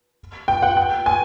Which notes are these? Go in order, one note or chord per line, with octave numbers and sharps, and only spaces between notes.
G5
F#5
G5
G#5